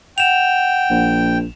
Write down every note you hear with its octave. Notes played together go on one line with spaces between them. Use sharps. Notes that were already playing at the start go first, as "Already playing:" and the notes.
F#5 G5 E7 F7
A#1